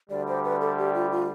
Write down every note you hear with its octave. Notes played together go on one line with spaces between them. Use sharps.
D2 D3 G3 D5
C5
B4
A4
G4
F4
F4